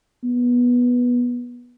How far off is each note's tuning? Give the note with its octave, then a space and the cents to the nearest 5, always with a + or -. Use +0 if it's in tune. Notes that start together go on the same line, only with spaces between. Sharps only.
B3 -15